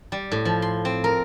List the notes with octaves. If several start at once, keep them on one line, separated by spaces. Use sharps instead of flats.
G3
A2
F3
C6
C4
A#4